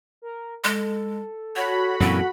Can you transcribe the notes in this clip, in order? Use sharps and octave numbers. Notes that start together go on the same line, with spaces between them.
A#4
G#3 A4
F#4 C#5 B5
F#2 A#2 E3 C4